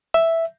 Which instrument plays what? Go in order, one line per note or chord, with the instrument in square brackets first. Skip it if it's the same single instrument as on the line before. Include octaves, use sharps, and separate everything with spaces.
[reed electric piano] E5